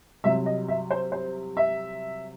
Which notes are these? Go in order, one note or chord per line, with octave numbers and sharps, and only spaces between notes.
C2 C3 F#3 E5
D#5
E5
C5
C5
E5